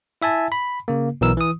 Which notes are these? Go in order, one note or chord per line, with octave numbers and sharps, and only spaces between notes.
E4 E5 G#5 A5
B5
C#3 A#3
B1 B2 E3 A#4 E6
E3 D#6